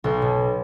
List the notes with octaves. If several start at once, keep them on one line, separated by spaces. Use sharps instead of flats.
B1
B2